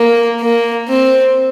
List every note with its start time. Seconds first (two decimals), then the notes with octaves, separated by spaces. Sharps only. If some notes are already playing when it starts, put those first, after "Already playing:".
Already playing: A#3
0.40 A#3
0.88 C4